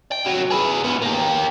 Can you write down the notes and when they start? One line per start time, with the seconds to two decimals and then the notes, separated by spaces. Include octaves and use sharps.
0.12 G5
0.25 C2 F#3
0.50 G#4 B4
0.84 G#2 B3
1.02 A#3 G4